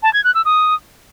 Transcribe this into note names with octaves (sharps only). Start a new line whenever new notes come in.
A5
G#6
F#6
E6
D#6